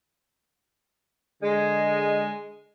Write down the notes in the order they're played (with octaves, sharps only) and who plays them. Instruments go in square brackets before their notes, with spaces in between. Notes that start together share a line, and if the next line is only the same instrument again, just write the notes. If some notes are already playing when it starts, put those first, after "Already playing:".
[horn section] D3 G#3